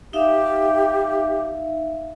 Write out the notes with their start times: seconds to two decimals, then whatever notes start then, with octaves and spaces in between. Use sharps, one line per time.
0.13 D#4 G4 E5 F5